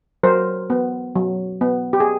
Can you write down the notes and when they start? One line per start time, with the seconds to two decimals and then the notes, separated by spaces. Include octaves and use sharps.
0.23 F#3 A#4 C5
0.70 B3
1.15 F#3
1.61 B3
1.93 G4
2.00 G#4